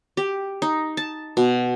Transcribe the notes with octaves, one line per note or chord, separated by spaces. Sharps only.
G4
D#4
A5
B2